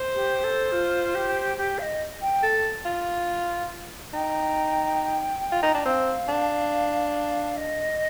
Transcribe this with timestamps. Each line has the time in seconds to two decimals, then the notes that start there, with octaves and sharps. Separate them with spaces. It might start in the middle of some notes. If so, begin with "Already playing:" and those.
Already playing: C5
0.14 G4
0.43 A4
0.72 F4
1.14 G4
1.57 G4
1.78 F5
1.82 D#5
2.21 G5
2.43 A4
2.85 F4
4.14 D#4 G5
5.52 F4
5.63 D#4
5.74 D4
5.85 C4 F5
6.29 D4
7.56 D#5